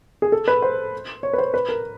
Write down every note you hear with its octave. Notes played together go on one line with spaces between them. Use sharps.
G#4
A4
B4
C5
C#5
B4
C5
B4
A#4